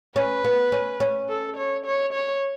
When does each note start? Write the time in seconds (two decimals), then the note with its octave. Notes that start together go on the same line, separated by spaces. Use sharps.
0.16 C#4 B4
0.44 B3
0.72 C#4
1.00 C#4
1.29 A4
1.57 C#5
1.86 C#5
2.13 C#5